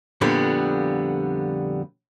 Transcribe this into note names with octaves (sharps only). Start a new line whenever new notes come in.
F2 A#2 D3 G3 B3